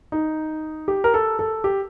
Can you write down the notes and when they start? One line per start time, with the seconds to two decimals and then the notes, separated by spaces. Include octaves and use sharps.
0.12 D#4
0.88 G4
1.04 A#4
1.14 A4
1.39 A4
1.64 G4